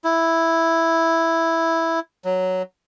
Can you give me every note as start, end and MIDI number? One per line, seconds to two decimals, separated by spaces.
0.04 2.00 64
2.25 2.62 54